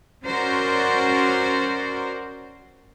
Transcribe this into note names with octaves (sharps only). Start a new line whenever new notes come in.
C#4 F#4 A#4 C5 D5